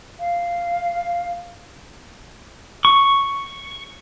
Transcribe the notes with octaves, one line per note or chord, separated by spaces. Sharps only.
F5
C#6